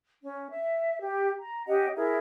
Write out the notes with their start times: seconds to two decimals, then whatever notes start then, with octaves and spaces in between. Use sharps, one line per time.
0.21 C#4
0.50 E5
1.01 G4
1.39 A#5
1.67 C#4 G4 D#5 F#5
1.95 E4 G#4 A#4 E5